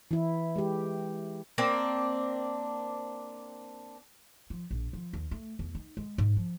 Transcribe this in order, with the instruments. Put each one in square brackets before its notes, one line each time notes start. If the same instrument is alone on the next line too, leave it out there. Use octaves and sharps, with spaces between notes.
[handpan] E3 E4
G#3 G4
[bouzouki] A#3 C4 D4
[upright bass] F3
A#1
F3
D#2
A3
E2
D#4
G#3
G#2
F3